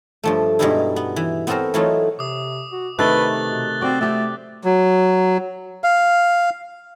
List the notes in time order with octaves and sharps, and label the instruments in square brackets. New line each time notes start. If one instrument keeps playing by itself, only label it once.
[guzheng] G2 F3 A3
G2 B2 G3 G#3 D#4 E4
B3
E3
B3 C4 F#4 A4 A#4 C5
E3 F#3 A3 B3 D#4 F4
[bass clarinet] C3 [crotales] D6 D#6
[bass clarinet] F#4
[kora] C3 D#3 A3 [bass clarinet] B4 [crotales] F#6 A6 G7
[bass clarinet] B2
[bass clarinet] C4 [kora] F#4 D5
[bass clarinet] A3 [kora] C4 G4
[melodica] F#3
F5